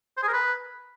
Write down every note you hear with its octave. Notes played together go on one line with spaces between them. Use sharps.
C5
G#4
A#4
B4